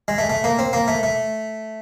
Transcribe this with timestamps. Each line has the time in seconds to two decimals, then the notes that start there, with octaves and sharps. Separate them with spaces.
0.08 G#3
0.18 A3
0.30 A3
0.44 A#3
0.59 C4
0.73 A#3
0.88 A3
1.03 A3